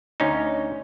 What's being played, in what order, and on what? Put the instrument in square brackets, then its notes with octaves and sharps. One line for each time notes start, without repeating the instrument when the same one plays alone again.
[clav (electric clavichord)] D2 C#4 D#4